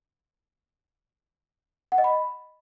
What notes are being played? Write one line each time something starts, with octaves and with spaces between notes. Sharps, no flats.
F#5
D#5
B5